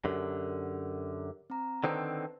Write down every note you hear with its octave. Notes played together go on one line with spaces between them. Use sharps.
F#2 D3 F#4 G4 A#4
C4 A#5
D3 D#3 C4 B4 C5 A5